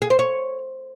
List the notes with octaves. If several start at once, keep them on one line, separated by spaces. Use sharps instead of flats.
G#4
C5
C#5